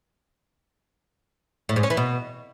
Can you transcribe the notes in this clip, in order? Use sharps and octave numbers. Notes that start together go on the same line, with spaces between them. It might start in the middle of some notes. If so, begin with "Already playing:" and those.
A2
G#2
C#4
E3
B2